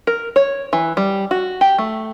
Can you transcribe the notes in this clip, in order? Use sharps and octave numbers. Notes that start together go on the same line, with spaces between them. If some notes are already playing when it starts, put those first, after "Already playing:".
A#4
C#5
E3
G3
F#4
G4
A3